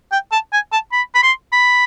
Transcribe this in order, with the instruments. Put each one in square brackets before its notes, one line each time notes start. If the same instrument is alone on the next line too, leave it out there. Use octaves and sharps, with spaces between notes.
[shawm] G5
A5
G#5
A5
B5
B5
C6
B5